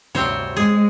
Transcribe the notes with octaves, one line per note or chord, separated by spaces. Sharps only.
D2 G2 C3 C4 C5 C#5
G#3 G#4